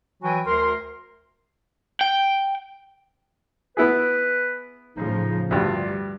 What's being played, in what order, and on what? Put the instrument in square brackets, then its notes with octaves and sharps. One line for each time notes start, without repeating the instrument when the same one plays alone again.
[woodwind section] E3 F#3 F#4 G5 G#5
D2 A#4 C6
[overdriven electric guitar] G5
[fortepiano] B3 E4 G#4 [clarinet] B4
[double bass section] A2 C#3 F3 [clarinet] D#4
[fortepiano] D2 G2 [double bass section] G3 [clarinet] F4